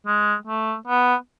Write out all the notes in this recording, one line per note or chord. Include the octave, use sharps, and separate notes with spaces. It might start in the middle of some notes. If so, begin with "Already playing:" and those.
G#3
A3
B3